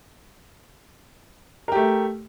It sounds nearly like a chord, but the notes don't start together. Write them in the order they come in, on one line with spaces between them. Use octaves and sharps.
A#4 G4 A3